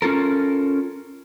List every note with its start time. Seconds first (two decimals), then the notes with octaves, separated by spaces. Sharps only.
0.02 C#4 F4 A4 A#4